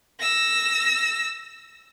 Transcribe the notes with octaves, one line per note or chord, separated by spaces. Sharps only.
E6 A#6